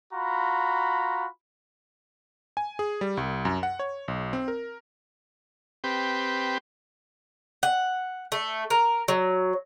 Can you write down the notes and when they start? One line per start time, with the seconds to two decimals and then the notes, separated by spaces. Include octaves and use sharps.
0.14 F4 F#4 A#5 B5
2.57 G#5
2.79 G#4
3.01 G3
3.17 C2
3.45 F#2
3.63 F#5
3.79 C#5
4.08 B1
4.33 C4
4.48 A#4
5.84 C4 G4 B4
7.63 F#5
8.32 A3
8.70 A#4
9.08 F#3